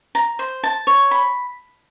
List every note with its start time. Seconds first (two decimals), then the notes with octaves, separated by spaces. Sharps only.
0.15 A#5
0.39 C5
0.63 A5
0.87 C#5
1.11 B5